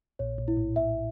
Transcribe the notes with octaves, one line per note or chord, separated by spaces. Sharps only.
A#1 A#2 C#5
A#1 A#2
E4
A2
A#1 A#2 E5